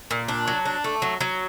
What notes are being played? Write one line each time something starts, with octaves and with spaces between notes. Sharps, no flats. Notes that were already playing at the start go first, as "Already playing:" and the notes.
A#2
D4
F#3
D4
A3
F#3
F#3